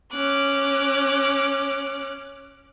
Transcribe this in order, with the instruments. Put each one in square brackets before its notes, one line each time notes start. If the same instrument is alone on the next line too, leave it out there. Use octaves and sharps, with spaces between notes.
[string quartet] C#4 D6 F#6